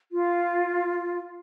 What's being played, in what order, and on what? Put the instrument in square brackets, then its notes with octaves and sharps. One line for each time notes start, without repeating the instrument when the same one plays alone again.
[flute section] F4